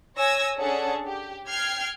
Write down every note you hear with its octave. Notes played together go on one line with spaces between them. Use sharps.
C#5 G#5 E6 G#6 A#6
C#4 D4 G#4 A4 F#5 A5
G4
G5 F6 G#6 C7